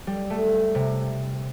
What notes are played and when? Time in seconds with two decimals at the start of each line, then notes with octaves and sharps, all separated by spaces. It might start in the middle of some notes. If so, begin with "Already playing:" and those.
0.07 G3
0.30 A3
0.75 C3